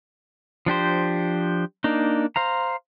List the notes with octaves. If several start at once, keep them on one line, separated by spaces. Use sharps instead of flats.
F3 D4 G4 C5
A#3 D4 D#4
C5 F5 A#5